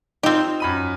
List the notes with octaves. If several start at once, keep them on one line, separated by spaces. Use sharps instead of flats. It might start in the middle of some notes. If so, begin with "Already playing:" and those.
C4 D#4 F4 G4
F#2 B5 D#7